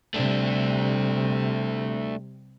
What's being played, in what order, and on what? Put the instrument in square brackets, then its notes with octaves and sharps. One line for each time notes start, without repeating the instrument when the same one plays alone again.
[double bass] C3 G3 [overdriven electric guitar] A3 D4